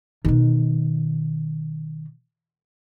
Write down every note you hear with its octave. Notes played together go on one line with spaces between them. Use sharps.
B2 D#3